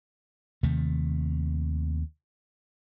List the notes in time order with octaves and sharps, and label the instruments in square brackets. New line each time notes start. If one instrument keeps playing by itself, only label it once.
[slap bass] D#2 C3 D#3 A3